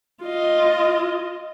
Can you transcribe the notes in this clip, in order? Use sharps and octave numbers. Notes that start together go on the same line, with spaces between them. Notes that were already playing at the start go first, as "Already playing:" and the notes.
F4 D#5